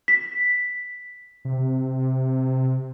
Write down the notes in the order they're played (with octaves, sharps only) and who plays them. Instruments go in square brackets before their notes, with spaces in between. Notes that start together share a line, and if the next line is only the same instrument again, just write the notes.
[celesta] B6
[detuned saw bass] C3